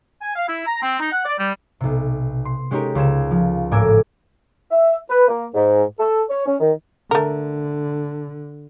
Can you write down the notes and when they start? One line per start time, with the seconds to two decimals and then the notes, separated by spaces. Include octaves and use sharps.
0.22 G#5
0.36 F5
0.48 E4
0.66 A#5
0.82 C4
1.00 D#4
1.12 F#5
1.25 D5
1.38 G3
1.80 B1 C3
2.45 C6
2.71 G#3 C#4 D#4 G4 A#4
2.95 C#2 C5 G#5 E7
3.31 F3
3.71 G#1 A2 A#4 G#5 D6 E6
4.71 E5
5.10 B4
5.28 A#3
5.54 G#2
5.99 A4
6.30 C#5
6.46 C#4
6.60 D#3
7.11 D3 A3 A#4